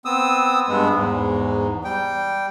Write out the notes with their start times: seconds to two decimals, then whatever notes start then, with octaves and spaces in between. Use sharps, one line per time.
0.05 B3 C4 D#6 E6
0.68 G2 G#3 B3
0.95 E2 G#2
1.84 G3 G5